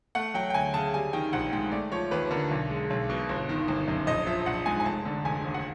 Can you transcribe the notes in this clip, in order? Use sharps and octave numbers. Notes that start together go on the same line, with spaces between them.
A3 F#5
F#3 G5
G5
D2 G#5
C#3 A5
G3 G#5
D#3 G5
A#1 F#5
G#2 G5
A3 D5
F3 C#5
D#2 B4
D3 A#4
B1
G#3
B1
B2
G1
D#3
G1
F#2
A#1 D#5
F3 E5
A#1 F#5
G#2 G#5
G#5
F1 A5
D3
F1 G#5
D#2
F#5